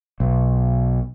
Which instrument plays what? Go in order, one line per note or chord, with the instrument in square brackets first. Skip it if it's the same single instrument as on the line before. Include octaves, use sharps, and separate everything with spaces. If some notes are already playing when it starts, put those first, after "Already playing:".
[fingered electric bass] B1